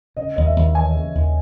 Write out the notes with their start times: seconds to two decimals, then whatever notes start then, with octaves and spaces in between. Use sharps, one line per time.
0.17 C#3 D#5
0.36 D#2 D#5
0.46 E5
0.56 D#2
0.75 E3 G#5
0.95 C#3
1.15 D#2